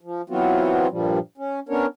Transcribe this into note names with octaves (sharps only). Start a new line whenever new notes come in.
F3
E3 F#3 B3 C4 F4 F#4
G2 A#2 F3 G3
C#4
B3 C#4 D4 A#4 C#5